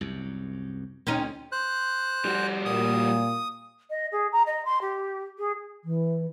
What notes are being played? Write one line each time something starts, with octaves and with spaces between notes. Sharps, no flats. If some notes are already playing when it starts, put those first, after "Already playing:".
C2 F#2
D2 C4 C#4 D#4
C5 F#6
G3 F#4
A#2 D#6
D#5
G#4
A#5
D#5
C6
G4
G#4
E3